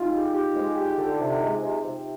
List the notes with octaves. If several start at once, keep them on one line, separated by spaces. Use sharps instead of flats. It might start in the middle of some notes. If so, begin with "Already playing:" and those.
Already playing: G#3 D#4 F4
G4
G4
G#3
G4
D3
C3
G#3
C3
C3